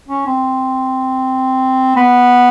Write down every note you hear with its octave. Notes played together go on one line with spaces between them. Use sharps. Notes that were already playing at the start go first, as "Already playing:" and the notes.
C#4
C4
B3